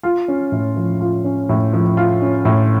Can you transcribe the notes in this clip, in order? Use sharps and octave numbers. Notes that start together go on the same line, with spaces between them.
F4
C#4
A2
F3
F4
C#4
A2
F3
F4
C#4
A2